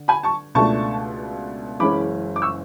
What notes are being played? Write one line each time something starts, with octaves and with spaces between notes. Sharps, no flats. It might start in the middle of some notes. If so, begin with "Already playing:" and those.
Already playing: D3
G#5 B5
A5 C#6
C#2 B2 A3 D4 A5 C#6
F#1 F#2 E3 G#3 C#4 B5 D6
D6
C#6 E6